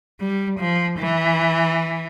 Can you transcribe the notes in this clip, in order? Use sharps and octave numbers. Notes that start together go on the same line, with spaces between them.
G3
F3
E3